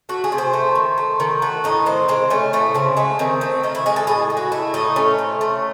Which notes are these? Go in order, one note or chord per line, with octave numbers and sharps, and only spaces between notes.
A3 F#4
G#4
C3
C5
A3
D#3
A3
D#3
A3 F#4
A2 D#4
D#3 C4
G#3 C4
A3 C#4
A2 A3
C#3 C4
G#3 A3
D#3 C4
A3 C4
D#3 D#4
E4
G#3 G#4
A4
A2 G#4
G#3
F#4
A3 E4
A2 D#4
A3 C#4
C3
A3